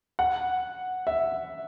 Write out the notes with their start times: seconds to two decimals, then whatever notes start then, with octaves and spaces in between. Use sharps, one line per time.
0.19 F#5
1.07 E5